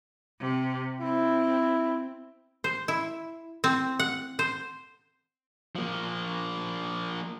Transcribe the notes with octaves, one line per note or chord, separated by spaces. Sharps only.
C3
C4 E4
C5
E4
C4
F#5
C5
F3 A#3